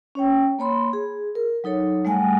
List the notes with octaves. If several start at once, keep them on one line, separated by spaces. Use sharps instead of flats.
C#4 C#5 G5
A#3 C#5 B5 C6
G#4
A#4
F#3 D#4 A4 C#5
G3 A3 F#5 G#5